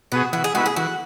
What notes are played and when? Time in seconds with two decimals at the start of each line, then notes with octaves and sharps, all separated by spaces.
0.12 B2 B3 F#4 G#4
0.33 E3 F#4
0.44 G#4
0.54 G#3 B3 E4 F#4
0.66 G#4
0.76 E3 F#4